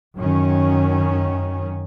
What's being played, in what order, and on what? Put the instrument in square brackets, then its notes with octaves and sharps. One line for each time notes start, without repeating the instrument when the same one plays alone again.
[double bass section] F#2 D#3 C#4